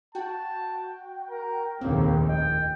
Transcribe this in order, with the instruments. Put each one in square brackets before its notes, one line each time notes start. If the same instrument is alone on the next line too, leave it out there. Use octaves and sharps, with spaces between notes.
[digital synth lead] F#4 [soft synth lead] G5 [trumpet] A5
[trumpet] A#4
[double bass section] F1 A#1 D#2 [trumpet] A#3 [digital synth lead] C4
[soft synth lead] D#5 [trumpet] G5